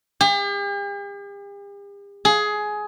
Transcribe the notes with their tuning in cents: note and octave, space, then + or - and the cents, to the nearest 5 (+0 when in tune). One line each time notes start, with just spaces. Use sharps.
G4 +45
G#4 +15